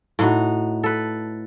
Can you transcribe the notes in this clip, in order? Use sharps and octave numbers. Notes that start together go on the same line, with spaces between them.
A2 D#4 F#4
A4 B4